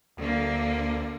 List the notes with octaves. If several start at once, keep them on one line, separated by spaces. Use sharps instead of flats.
D2 D3 A#3